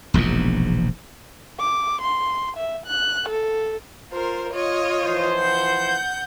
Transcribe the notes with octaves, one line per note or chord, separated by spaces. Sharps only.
E1 A#1 E2 G#2
D6
C6
E5
F#6
A4
F4 A#4 C5
F4 C#5 D#5
E3 F3 C5
F#5 G6